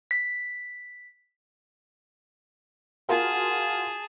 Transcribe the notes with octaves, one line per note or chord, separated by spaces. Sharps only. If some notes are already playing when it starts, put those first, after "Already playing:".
B6
F4 F#4 G#4 A#4 A5